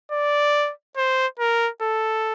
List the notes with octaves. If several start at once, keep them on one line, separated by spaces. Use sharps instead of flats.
D5
C5
A#4
A4